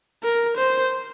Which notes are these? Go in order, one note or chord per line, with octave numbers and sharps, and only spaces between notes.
A#4
C5